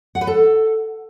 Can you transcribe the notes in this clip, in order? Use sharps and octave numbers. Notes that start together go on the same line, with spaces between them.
F#5
B4
A4